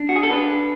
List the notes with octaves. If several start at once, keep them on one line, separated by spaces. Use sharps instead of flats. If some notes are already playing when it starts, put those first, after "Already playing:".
Already playing: D4
F#4
G#4
A4
D4 B4